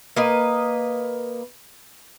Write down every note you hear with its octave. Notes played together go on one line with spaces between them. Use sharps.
A#3 B4 D#5